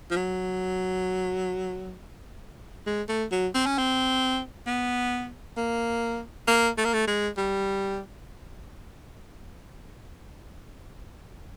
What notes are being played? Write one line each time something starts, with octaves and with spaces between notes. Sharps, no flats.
F3
F#3
G#3
A3
F#3
C4
C#4
C4
B3
A#3
A#3
A3
A#3
A3
G#3
G3